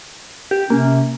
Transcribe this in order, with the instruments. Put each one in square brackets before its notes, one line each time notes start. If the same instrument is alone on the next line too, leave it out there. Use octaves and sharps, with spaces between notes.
[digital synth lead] G4
[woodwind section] C3 C#4 [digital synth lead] A#3